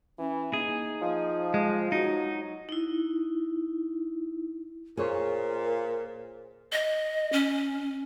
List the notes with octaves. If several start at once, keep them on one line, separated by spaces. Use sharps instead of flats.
E3 C#4
A#3 D#4 G#4
F3 D#5
G#3
F#3 D#4 F#4
D#4 E4
A#2 G#4 A#4 C5 C#5
D#5
C#4